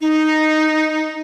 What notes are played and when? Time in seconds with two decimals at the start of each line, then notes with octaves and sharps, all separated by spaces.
0.01 D#4